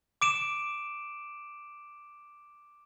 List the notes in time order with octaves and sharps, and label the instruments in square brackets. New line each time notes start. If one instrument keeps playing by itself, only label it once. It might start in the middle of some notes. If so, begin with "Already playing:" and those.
[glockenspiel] D6 D7 E7